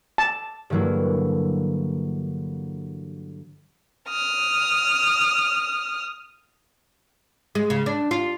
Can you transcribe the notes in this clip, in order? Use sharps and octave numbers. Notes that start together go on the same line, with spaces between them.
A5
G2 D3 E3 F#3 A#3 E4
D#6 F6
G#3
C#3
D4
F4